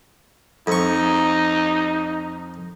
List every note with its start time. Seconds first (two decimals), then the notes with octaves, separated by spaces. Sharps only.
0.67 F2 D#4 C#6